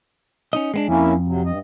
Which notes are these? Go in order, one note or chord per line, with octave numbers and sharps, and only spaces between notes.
C#4 D#4 D#5
G#3 B3 D4
F2 A#3 C#4 E4
C3 F#3
G2 D#5